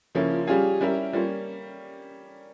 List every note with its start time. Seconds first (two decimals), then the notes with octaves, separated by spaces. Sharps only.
0.15 C#3 F3 A#3 C#4 E4
0.32 F4
0.47 G3 C#4 F4 G4 G#4
0.81 G3 C#4 E4 A#4 E5
1.13 G3 A#3 C#4 F4